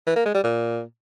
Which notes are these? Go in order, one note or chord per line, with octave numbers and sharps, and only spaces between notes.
E3
A#3
G#3
G3
A#2